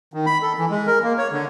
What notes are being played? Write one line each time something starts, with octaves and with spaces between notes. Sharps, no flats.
D#3
B5
A4
E3
G#3
A#4
A#3
C#5
D3